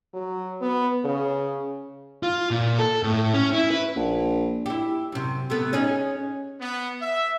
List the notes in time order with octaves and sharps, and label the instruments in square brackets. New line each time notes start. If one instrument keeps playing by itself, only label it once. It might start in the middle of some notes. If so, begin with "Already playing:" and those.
[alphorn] F#3
B3
C#3
[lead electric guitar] F4
A#2
A4
A2
C#4
E4
B4
[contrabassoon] A#1
[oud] E4 G4
F#2 C3
C3 A3 B3
C#4 D#4 G#4
[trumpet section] B3
E5